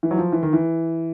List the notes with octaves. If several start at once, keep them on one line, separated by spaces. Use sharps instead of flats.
E3
F#3
F3
E3
D#3
E3